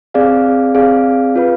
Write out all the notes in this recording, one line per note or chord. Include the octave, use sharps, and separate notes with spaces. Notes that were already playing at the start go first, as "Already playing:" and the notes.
C4 G#4 D5 F5
C4 G#4 D5 F5
F4 B4 F5